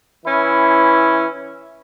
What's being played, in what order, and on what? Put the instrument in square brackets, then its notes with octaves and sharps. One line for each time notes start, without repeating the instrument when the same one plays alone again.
[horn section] E3 C#4 E4